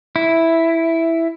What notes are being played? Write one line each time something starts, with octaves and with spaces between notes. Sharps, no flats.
E4